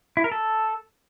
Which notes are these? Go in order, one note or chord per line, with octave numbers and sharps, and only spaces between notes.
E4
A#4
A4